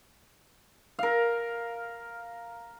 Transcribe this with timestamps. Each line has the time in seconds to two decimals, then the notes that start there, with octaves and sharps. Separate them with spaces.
0.99 A#4 F5